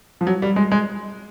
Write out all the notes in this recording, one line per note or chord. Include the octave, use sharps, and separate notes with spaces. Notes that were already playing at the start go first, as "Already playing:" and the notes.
F3
F#3
G3
G#3
G#3